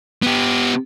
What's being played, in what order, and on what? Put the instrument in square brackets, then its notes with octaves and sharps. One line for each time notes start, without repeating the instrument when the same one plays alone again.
[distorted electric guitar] B3 G4